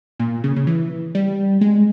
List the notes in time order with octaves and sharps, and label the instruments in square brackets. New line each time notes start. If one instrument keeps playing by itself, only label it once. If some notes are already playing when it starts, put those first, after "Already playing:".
[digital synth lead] A#2
C#3
C#3
E3
G3
G#3